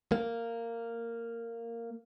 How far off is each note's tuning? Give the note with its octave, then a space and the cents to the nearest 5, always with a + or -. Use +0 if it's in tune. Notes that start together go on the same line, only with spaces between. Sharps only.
A#3 -15